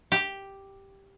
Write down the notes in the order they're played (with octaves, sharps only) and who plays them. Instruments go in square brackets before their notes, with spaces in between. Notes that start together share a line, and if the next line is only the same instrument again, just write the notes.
[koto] G4